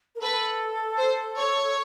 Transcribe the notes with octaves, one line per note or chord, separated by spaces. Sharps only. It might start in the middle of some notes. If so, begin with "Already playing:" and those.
A#4
A4 B4
C5
C#5